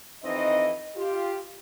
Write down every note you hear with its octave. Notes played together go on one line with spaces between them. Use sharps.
F2 E3 C4 D#4 D#5
F4 G4